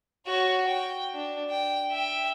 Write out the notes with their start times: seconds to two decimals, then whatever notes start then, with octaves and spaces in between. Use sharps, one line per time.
0.27 F#4 C#5
0.66 G5
1.14 D4
1.50 G5
1.91 E5 G5